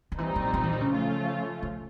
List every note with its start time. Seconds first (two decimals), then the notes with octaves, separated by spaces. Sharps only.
0.12 D#3
0.18 A#2 E3 G3 C4 D#4
0.36 F#3
0.54 F3
0.63 E3
0.73 D#3
0.81 C#3
0.90 F3 A3 C#4 F4
1.63 C#3